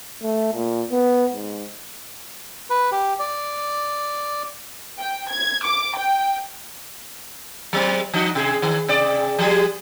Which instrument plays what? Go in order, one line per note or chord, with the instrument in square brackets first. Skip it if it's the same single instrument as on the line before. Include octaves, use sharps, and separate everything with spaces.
[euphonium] A3
A#2
B3
G#2
[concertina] B4
G4
D5
[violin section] G5
G#6
D6
G5
[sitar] F#3 G#3 C4
F3 D#4 F#4
C3 G#4
D#3
C3 G#4 D5
F3 G3 G#4